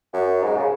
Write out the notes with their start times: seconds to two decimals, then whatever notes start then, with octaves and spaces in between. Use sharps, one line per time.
0.13 F#2
0.43 G#2
0.56 C#3